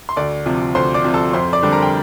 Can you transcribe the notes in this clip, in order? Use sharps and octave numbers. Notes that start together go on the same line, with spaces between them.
C6
D2 D5 D6
C3 F3
D2 C5 C6
D5 D6
C3 F3
A4 A5
F2 C5 C6
D5 D6
D3 G3 D4
A#4 A#5
G5